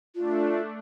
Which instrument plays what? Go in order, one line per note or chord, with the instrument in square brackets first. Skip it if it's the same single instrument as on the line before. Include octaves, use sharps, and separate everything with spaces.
[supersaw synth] A3 D4 [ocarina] F4